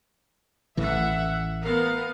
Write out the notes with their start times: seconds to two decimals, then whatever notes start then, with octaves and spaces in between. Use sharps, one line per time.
0.77 A1 A2 E3 E5 F#5
1.62 B3 A#4 F5